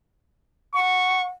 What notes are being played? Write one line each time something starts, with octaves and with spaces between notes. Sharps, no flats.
F#5 C#6